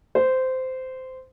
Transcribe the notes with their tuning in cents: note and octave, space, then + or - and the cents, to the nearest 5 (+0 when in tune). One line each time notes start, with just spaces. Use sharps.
C5 -15